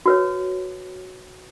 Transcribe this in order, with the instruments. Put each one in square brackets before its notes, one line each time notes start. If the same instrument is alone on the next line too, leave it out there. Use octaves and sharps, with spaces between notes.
[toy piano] F#4 B4 C#5